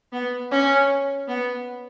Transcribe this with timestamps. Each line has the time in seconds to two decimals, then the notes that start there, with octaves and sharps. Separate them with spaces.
0.12 B3
0.51 C#4
1.28 B3